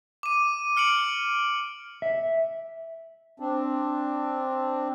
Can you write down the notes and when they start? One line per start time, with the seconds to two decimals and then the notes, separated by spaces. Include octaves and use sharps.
0.23 D6 D#7
0.77 F6 C#7 D7 F#7
2.02 E5
3.40 C4 D4